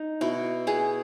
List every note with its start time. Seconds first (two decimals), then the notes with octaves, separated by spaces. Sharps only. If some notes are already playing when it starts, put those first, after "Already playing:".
Already playing: D#4
0.21 B2 E4
0.67 B3 G#4